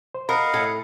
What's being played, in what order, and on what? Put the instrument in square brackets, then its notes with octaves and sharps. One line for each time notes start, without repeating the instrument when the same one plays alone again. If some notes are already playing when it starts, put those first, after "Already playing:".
[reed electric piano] C5
[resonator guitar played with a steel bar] A#4 [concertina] D#5 F5 F#5 [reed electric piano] B5
[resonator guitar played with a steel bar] A2 A4